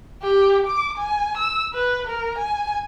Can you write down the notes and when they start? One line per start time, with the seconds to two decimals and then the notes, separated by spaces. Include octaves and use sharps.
0.22 G4
0.66 D6
0.98 G#5
1.38 E6
1.74 B4
2.07 A#4
2.38 G#5